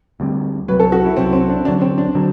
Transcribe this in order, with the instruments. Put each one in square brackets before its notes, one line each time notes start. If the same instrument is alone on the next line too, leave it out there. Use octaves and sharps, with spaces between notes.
[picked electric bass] D2 D3 G3 C4
[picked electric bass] C2 C3 F#3 [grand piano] B4
[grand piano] A4
F#4
E4
[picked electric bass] C2 C3 F#3 [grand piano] C4
[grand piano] C4
D4
[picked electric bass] D2 D3 F#3 [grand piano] D4
[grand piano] C4
D4
[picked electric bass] D3 F#3